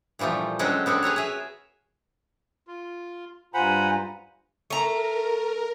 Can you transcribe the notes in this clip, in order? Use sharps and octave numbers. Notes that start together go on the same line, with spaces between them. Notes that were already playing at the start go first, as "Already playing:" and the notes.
A#2 E3 F3 G3 A3
D3 F#3 G#3 C4 C#4 A4
B3 C4 D4 F#4 A4
G#4 A#4 B4 C#5
G#4 E5
F4
G2 F4 C5 F#5 G#5 A#5 B5
A3 A#4 A#5